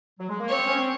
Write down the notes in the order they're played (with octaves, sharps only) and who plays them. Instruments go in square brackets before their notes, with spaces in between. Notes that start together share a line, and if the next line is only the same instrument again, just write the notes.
[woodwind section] F#3
G#3
A#3
[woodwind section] C4 [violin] C#5
[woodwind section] C#4
C4